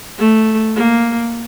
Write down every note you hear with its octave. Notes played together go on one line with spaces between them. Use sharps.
A3
A#3